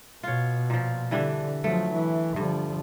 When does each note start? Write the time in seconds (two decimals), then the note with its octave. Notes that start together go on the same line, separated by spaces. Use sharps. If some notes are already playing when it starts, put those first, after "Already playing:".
0.23 B2 F4 C#5
0.70 A#2 F3
1.11 D3 E3 G3 D4
1.64 F3 F#3 A3
1.92 E3
2.36 G2 D3 F3